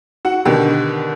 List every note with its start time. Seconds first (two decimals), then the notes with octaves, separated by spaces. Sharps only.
0.25 F#4 F#5
0.45 B2 D3 D#3 G4